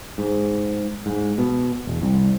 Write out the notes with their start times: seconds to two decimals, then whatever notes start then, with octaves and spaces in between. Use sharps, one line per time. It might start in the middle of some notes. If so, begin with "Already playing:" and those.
0.18 G#2
1.06 G#2
1.38 B2
1.87 E1
2.02 C2